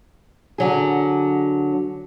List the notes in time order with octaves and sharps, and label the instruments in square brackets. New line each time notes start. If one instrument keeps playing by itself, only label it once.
[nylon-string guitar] D3 F#3 G#4